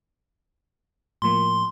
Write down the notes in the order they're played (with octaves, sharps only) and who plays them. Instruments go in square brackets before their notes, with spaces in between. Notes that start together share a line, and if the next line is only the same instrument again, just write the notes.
[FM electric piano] A2 F3 A#3 [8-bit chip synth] C6